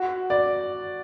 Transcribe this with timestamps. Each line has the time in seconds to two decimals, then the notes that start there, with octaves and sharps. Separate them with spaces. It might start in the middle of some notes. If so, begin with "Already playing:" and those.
Already playing: F#4
0.30 D5